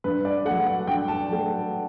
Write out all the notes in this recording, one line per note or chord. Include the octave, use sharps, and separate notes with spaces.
G2 B4
D5
F#3 A3 F#5
F#5
G2 G5
A5
F#3 A3